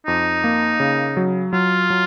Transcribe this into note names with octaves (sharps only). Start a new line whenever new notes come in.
F2 D#4
A#3
C#3
F#3
F#3 F4
F#3